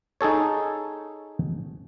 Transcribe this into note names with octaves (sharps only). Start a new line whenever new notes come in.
D#4 G#4 A4 C#5